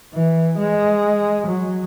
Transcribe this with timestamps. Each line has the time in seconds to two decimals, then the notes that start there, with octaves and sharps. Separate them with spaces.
0.14 E3
0.58 G#3
1.47 F#3